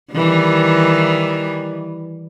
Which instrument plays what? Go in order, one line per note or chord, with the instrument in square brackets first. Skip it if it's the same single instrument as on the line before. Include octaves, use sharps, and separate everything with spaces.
[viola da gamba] D#3 E3 G3